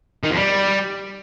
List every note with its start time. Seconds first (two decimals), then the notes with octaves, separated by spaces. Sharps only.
0.24 D#3
0.30 F2
0.37 G3